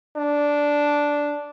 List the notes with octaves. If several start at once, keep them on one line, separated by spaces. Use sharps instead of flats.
D4